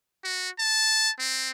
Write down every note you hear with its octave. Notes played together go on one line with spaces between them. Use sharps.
F#4
A5
C4